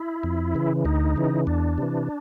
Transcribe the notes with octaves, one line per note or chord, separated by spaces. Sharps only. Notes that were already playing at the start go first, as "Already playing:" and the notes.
Already playing: E4
F2
C#3 E3
D2 D#4
C#3 E3
E2 D4
C3 E3